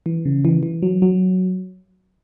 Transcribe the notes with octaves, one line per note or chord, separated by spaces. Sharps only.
E3
C#3
E3
E3
F#3
F#3